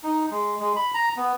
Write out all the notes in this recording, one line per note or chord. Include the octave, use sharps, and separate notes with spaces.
D#4
G#3
G#3
B5
A#5
B3